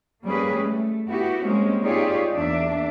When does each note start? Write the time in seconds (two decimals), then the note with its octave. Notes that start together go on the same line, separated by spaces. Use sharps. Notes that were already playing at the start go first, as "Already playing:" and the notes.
0.24 G3 A#3 C#4 G#4 B4
0.57 A3
1.08 B3 E4 F#4 G4
1.44 G3 G#3 A#3 C4 C#4
1.82 D#4 F4 G4 G#4 C#5 D5
2.33 E2 A#3 D4 E5